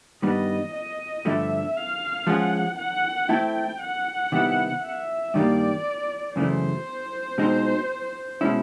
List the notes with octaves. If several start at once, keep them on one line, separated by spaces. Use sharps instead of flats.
G2 D#3 G3 B3 D#5
D#5
G2 D3 F3 A3 E5
F5
F3 G#3 C#4 F4 G#4 F#5
F#5
A3 C4 E4 A4 G5
F#5
C3 D#3 G3 B3 E4
E5
G2 D#3 G3 A#3 D5
F#2 C#3 E3 A3 C5
B2 G#3 C4 D#4
B2 G#3 C#4 E4